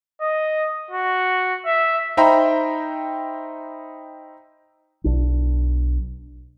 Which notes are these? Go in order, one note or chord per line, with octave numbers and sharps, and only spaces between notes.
D#5
F#4
E5
D#4 C5 E5 G5 A#5 B5
B1 D4